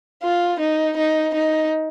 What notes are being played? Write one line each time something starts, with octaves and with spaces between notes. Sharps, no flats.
F4
D#4
D#4
D#4